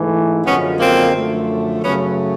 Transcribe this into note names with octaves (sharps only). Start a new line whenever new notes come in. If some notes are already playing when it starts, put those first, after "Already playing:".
Already playing: G#2 E3 A3
F#2 D3 F3 G#3 B3 C#4
A#3 C4
F#2 D3 F3 A3
F#2 C#3 F#3 A3 B3 C#4